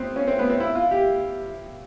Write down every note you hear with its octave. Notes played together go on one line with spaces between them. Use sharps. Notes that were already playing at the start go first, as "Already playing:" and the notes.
Already playing: B3 C4
C#4
C4
B3
C4
E4
F4
G4